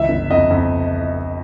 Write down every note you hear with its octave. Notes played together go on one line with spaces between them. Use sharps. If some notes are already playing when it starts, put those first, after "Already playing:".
Already playing: C#2 E3 E5
G1
F2 D#5
F2